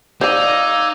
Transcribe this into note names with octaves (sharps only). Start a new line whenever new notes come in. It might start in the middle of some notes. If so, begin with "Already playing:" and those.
D#4 C5 D5 F5 D6 E6 G#6